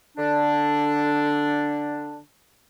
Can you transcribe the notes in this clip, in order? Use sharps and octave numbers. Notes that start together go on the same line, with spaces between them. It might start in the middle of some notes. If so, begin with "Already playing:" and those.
D3 D4